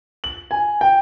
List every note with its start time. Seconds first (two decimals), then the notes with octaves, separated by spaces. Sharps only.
0.24 F#7
0.51 G#5
0.81 G5